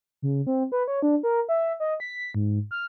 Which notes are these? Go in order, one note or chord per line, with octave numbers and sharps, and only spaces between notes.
C#3
C4
B4
C#5
D4
A#4
E5
D#5
B6
G#2
F6